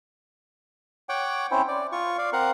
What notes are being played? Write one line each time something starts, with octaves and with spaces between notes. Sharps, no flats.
C#5 F#5 G5 D6
C4 C#4 E4 C5
D5
F4 C#6
D5 F5
C4 A#4 F5 F#5